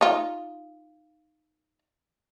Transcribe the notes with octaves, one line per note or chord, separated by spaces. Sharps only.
D#4 F4